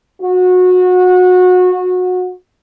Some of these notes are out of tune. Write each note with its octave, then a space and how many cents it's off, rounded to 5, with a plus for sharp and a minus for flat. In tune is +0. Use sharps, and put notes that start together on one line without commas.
F#4 -25